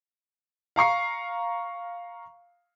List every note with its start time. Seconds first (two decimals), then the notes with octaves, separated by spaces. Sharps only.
0.76 F5 A#5 C#6 C7